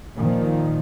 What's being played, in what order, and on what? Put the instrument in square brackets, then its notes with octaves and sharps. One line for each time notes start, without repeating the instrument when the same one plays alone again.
[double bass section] A#2 D#3 F3